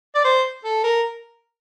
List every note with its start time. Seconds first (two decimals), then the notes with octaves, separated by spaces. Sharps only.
0.15 D5
0.24 C5
0.64 A4
0.84 A#4